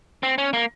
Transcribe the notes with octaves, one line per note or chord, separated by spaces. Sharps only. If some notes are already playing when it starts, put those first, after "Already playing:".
C4
C#4
A#3